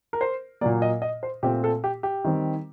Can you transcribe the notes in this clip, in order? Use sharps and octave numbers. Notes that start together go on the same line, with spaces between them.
A#4
C5
A#2 F#3 A#3 D5
D#5
D#5
C5
A#2 A3 C4 G4
A4
G4
G4
D#3 G3 C4